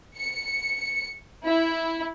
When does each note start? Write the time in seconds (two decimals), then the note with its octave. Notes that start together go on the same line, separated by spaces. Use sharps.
0.17 C#7
1.46 E4